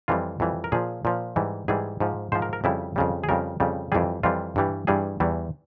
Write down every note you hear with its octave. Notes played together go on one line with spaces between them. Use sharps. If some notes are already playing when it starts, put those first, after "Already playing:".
F2 E3 G3 F4
F2 E3 G3
A#4
A#2 F3 G#4
A#2 F3
G#2 E3 G3
G#2 E3 G3 G#4
G#2 F3
G#2 F3 C5
A#4
A#4
F2 C#3 G3 E4
F2 C#3 G3
G#4
F2 C#3 G3 A#4
F2 C#3 G3
F2 E3 G3 G#4
F2 E3 G3 F4
G2 E3 G3
G2 E3 G3 G#4
E2 E3 G3